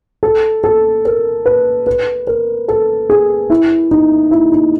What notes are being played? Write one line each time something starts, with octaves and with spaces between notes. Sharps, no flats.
A4
A4
A#4
B4
B4
A#4
A4
G#4
E4
D#4
E4
D#4